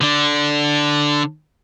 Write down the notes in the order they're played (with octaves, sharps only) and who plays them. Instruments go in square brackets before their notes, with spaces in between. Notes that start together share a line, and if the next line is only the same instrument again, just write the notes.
[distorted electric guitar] D3 D4